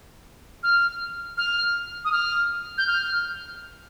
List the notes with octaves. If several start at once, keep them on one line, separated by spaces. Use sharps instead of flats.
F6
F6
D#6
F6
G6
F6